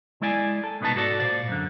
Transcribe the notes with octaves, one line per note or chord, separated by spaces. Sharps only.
G#3 E4 D5 G#5
A4
C2 B2 B3 D#4 A5
G#2 F#4 A4 D5
A#2 C5 D5
F#2 D3